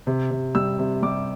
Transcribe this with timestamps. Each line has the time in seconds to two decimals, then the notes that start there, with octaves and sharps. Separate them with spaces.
0.07 C3
0.31 C3
0.55 G3 E6
0.79 C3
1.02 G3 D6